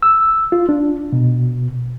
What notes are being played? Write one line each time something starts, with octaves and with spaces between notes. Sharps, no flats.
E6
F4
D4
B2